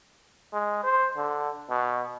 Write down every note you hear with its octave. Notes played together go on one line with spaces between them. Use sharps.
G#3
C5
D3
B2